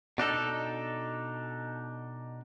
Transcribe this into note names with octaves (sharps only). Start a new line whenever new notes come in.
B2 D4 D#4 A4